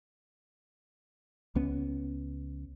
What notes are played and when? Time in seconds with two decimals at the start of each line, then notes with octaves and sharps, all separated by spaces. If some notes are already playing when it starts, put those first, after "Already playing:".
1.55 C#2 B3 C#4